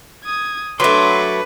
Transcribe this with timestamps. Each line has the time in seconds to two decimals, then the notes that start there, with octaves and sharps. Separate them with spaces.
0.24 D#6 G#6
0.80 F#3 A3 D4 B4 C6 D6